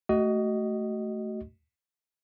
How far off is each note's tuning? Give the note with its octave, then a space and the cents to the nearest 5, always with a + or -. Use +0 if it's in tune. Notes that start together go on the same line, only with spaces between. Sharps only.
A3 +0 F#4 +30 D#5 +0